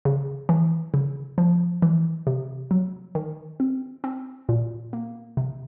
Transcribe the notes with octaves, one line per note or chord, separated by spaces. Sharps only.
C#3
E3
C#3
F3
E3
C3
F#3
D#3
C4
C4
A#2
A#3
C3